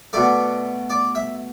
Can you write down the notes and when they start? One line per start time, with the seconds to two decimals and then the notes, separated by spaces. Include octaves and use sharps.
0.13 B2 A3 D5
0.90 D5
1.15 E5